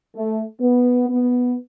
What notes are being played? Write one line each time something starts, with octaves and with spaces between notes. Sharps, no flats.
A3
B3
B3